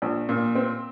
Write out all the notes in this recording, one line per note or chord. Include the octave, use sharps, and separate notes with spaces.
A#1
A#2
C4